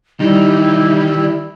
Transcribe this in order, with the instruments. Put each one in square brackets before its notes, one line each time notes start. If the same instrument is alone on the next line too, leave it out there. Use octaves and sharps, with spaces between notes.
[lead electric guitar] D#3 E3 [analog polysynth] G3 [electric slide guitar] D#4 [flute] E4